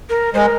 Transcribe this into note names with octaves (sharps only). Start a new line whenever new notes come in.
A#4
G#3 A#4 C5